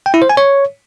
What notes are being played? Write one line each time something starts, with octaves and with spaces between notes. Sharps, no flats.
G5
E4
C5
G#5
C#5